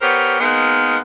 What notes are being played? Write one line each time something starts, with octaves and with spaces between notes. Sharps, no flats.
B3 G4 A#4 C5 C#5
D#3 G#3 A#3 B3